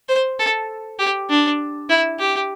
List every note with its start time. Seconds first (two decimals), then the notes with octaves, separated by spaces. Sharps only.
0.09 C5
0.39 A4
0.99 G4
1.30 D4
1.90 E4
2.19 G4